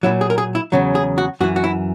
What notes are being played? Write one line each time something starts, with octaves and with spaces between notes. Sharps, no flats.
A#2 F#3 E4
G#4
A#4
G#4
E4
E2 C#3 F#3
G#4
F#4
F#2 E3 F#4
F#4
E4